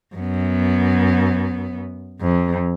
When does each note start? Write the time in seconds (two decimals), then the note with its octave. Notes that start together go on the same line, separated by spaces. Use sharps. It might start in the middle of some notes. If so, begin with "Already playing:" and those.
0.16 F#2 B3
2.21 F2